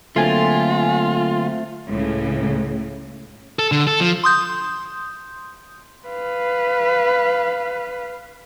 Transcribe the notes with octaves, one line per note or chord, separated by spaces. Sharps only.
D3 F#3 A3 A#3 C4 F4 G#5 C6
C#2 A2 C#3
A4
D3
A4
F3
C6 D#6 G6
B4 F5